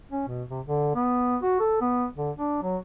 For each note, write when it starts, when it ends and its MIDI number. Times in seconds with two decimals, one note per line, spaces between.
0.11 0.24 61
0.27 0.43 47
0.50 0.60 48
0.66 0.95 50
0.95 1.37 59
1.43 1.58 66
1.60 1.80 69
1.81 2.06 59
2.17 2.31 50
2.37 2.58 62
2.62 2.77 54